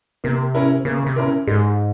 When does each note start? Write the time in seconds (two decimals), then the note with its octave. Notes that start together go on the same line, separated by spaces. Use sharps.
0.24 C3 A#3
0.54 C#4 E4 A#4
0.85 C#3 A#3
1.06 C3
1.16 C#4 E4 A#4
1.47 G#2 G#3